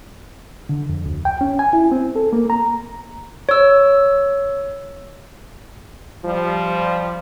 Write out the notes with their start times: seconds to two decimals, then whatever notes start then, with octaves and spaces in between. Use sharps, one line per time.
0.69 D3
0.89 F2
1.06 D2
1.25 G5
1.41 C#4
1.59 G#5
1.73 E4
1.92 C4
2.16 A4
2.33 A#3
2.50 A#5
3.49 C#5 E6
6.24 F3 G3